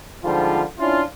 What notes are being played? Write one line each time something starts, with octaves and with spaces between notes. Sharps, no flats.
G#2 D3 F3 G3 F4
C#4 D4 E4 F4